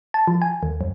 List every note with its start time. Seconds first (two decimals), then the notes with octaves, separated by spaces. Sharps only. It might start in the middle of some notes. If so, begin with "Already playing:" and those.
0.14 A5
0.28 F3
0.42 G#5
0.63 D#2
0.81 F#2